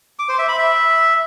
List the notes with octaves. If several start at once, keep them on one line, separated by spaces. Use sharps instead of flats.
D6
C5
E5
B5
E5